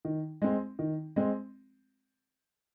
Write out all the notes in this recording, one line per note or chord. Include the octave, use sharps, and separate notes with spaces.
D#3
G#3 C4
D#3
G#3 C4